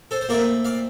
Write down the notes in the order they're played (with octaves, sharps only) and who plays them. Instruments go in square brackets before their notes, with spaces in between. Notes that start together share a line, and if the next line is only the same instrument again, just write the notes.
[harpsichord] A4 C5
C5
A#2 A3 C4 A#4 D5
D5 F5